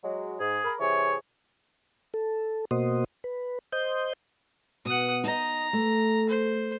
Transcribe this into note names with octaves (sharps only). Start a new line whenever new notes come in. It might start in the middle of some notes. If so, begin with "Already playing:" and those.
F#3 G#3
G#2 G#4
A#4 B5
C3 E3 G#4 C#5
A4
B2 A#3 F#4 C5 D#5
B4
C5 D#5 G6
B2 F#5 D#6
D#4 D#5 A#5
A3
C5